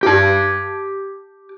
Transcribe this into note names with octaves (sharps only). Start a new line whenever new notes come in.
G4 A5